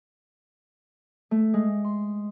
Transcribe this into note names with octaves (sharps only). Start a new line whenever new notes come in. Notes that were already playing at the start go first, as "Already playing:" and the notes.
A3
G#3
C6